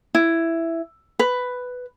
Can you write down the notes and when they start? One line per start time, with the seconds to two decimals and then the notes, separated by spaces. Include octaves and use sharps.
0.15 E4
1.19 B4